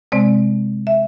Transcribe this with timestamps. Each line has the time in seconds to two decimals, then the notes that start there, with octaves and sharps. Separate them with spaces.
0.12 C3 G#3 C4 D5
0.87 E5